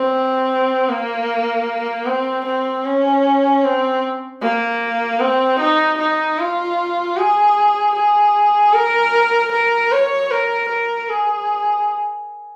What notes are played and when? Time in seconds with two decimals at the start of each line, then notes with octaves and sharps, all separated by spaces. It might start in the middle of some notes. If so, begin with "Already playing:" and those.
Already playing: C4
0.89 A#3
2.07 C4
2.46 C4
2.85 C#4
3.64 C4
4.42 A#3
5.21 C4
5.60 D#4
5.99 D#4
6.39 F4
7.17 G#4
7.96 G#4
8.74 A#4
9.52 A#4
9.92 C#5
10.31 A#4
10.70 A#4
11.09 G#4